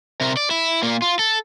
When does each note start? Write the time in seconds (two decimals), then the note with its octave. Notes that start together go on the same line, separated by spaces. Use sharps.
0.21 C3 A#4
0.37 D5
0.51 E4
0.83 A#2 A#3
1.02 F4
1.19 A4